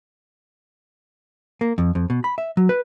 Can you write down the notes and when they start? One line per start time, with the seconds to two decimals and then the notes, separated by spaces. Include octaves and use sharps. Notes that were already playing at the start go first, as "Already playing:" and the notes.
1.61 A#3
1.78 F2
1.95 F2
2.10 B2
2.24 B5
2.38 E5
2.57 F#3
2.69 B4